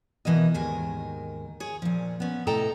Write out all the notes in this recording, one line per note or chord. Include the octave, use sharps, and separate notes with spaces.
B2 E3 A#4 D#5
D#2 G#2 D#3 A#4 G#5
G#4 C#5
A#2 F3
B3 C#4
A2 C3 A4 D#5 G5 A#5